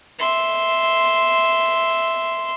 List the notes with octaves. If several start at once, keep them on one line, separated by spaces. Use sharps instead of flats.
E5 C6